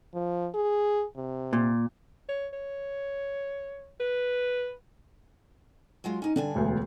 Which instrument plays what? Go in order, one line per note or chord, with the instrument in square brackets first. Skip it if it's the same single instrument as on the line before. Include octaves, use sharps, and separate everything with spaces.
[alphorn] F3
G#4
C3
[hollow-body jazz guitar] A#2
[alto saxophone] C#5
C#5
B4
[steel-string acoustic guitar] F#3 G#3 F4
C#4 D#4
[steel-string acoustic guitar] G2 D4 G#5 [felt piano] D3
[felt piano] E1 D2 B3